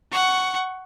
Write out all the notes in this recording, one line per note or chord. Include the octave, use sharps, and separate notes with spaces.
F#5 C#6